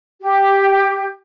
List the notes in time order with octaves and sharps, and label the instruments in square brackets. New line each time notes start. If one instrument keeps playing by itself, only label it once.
[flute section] G4